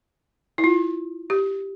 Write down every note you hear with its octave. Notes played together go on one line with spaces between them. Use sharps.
E4
F4
G4